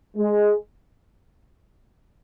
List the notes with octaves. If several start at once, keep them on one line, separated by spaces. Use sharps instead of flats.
G#3